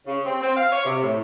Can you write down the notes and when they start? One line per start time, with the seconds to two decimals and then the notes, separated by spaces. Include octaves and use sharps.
0.07 C#3
0.25 C4
0.42 C4
0.57 F5
0.72 C#5
0.85 C3
1.03 A2